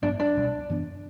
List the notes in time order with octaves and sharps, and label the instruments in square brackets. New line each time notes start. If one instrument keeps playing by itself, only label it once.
[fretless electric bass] A1 G2 F#3 B3 [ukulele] D4
[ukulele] D4
[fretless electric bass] C#2 B2 G3
F#2 E3 B3 D4